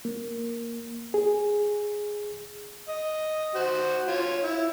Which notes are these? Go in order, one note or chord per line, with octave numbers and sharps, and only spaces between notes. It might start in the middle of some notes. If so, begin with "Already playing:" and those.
A#3
G#4
D#5
F#4 C5
F4 C#5
E4